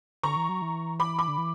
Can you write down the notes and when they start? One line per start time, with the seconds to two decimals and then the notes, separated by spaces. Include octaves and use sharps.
0.23 D3 A#5 C#6
0.36 E3
0.49 F#3
0.62 E3
1.00 B5 D6
1.19 B5 D6
1.28 D3
1.38 E3